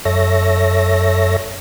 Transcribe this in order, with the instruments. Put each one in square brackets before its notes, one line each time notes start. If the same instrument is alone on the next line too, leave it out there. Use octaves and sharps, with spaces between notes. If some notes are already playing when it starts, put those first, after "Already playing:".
[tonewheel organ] F#2 A4 C#5 E5 A#6